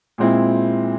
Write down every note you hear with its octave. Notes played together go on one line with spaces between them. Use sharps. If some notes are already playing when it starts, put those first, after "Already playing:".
A#2 G#3 C4 E4